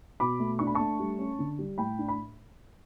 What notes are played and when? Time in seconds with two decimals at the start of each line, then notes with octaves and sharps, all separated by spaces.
0.20 B2 B5 D6
0.40 A3
0.59 D4 C#6
0.67 B5
0.75 A3 A5 C#6
1.00 G3
1.19 C#4
1.39 D3
1.59 G3
1.78 A2 G5 B5
1.99 D4
2.08 B5